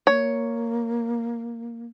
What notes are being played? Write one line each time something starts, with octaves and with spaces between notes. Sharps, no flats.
A#3 C#5